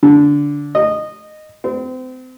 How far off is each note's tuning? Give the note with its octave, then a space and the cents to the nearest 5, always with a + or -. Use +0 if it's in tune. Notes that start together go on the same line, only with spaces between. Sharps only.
D3 -15
D#5 -15
C4 -35